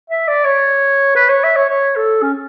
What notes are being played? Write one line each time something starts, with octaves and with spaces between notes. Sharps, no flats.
E5
D5
C#5
B4
C#5
E5
C#5
C#5
A4
C#4